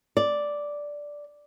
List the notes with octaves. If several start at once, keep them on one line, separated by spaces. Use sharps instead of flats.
D5